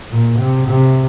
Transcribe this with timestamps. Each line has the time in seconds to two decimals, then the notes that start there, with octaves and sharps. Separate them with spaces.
0.12 A#2
0.39 C3
0.68 C3